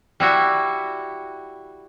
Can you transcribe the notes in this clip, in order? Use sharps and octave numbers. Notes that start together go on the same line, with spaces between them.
G3 E4 F#4